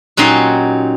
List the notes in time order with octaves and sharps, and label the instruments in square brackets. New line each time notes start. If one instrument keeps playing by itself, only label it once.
[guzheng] A#2 F#3 C#4 D#4 G4 C6